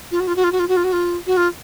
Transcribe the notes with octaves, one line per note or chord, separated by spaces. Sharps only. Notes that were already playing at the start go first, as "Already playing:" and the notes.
F4
F#4
F4
F#4
F4
F#4
F4
F#4
F4
F#4
F4
F#4
F4